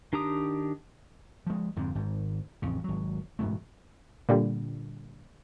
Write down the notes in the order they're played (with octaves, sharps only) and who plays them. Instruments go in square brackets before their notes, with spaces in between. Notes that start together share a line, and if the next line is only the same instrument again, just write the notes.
[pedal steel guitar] D#3 D4 G4 A#5 D#6
[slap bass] F3 G#3
F2 G#2 D3
G#1 G#2
A1 F2 C#3
G#1 F#3
E1 G#2 B2 A3
[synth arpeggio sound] A#2 D3 G3